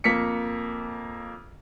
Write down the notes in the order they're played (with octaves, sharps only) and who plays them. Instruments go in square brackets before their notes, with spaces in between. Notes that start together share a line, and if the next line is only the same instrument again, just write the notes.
[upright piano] F2 A#3 B6 C#7